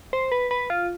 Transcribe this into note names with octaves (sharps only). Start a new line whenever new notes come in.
C5
B4
B4
F4